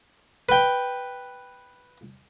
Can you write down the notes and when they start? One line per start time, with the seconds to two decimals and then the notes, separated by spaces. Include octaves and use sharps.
0.49 B4 G5